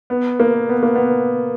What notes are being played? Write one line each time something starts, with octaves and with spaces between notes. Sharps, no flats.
B3
A#3
B3
A#3
B3